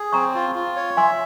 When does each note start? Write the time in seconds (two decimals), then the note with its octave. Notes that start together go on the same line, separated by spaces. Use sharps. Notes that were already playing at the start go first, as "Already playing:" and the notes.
Already playing: G#4
0.13 C4 A#5 C#6
0.35 F4
0.55 F4
0.76 C#5
0.97 E5 G#5 C6